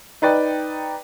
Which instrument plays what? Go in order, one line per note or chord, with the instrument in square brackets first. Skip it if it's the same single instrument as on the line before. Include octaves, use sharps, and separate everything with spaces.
[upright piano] D#4 B4 D5 G5